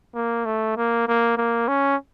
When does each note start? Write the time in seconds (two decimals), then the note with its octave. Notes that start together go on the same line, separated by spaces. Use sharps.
0.15 A#3
0.46 A3
0.77 A#3
1.08 A#3
1.38 A#3
1.68 C#4